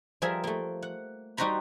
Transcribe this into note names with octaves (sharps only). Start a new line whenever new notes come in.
F3 G3 G#4 A#4 E5
A3 A#3
F#5
G3 D#4 F#4 C5 A#5 B5